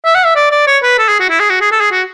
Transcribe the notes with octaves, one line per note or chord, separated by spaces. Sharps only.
E5
F#5
E5
D5
D5
C#5
B4
A4
G#4
F#4
E4
G#4
F#4
G#4
A4
G#4
F#4